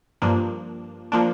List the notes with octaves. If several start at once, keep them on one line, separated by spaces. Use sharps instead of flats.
G2 F3 A#3 D4
F3 A#3 D4